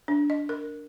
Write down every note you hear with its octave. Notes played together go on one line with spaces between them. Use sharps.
D4
D#5
A#4